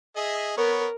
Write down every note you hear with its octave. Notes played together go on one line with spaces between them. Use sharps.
G#4 D#5 E5
B3 A#4 C#5